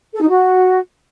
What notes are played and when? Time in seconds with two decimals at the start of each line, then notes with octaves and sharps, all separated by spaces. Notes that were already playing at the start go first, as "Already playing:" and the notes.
0.14 A4
0.21 D#4
0.29 F#4